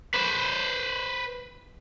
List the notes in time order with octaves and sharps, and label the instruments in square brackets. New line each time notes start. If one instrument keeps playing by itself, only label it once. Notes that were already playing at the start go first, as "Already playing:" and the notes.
[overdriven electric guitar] B4 C5